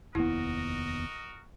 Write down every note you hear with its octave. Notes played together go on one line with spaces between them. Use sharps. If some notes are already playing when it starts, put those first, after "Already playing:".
F1 D#2 B3 E4 F#4 A#4 D#5